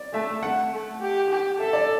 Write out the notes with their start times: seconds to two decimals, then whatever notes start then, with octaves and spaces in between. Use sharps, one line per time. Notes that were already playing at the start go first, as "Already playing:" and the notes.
Already playing: D5
0.13 A3 E5
0.43 A3 F#5
0.72 A3
1.01 G4
1.30 G4
1.59 A4 E5
1.73 D5